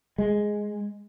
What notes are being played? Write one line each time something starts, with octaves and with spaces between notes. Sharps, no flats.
G#3